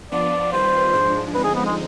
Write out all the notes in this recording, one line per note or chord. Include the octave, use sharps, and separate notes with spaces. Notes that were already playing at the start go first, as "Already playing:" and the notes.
F3 B3 D4 F4 D5
D#3 G3 C4 F4 B4 C5
G#2 F3 G#3 D4
D3 F3 G#3 C4 D#4 B4
G#4
B3
G#3